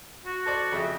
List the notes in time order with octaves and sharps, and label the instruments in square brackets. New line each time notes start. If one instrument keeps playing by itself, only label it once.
[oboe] F#4
[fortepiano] A4 C5 D5
F2 C#3 E5